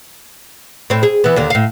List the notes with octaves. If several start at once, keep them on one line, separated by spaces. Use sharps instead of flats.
A2 C4
G#4
E3 B3
D#2 D3
A2 F5